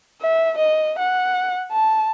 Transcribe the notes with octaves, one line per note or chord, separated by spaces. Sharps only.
E5
D#5
F#5
A5